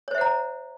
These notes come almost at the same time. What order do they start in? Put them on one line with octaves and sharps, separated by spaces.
C#5 C5 E5 F#5 A#5